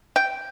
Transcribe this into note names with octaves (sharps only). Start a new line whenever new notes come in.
G5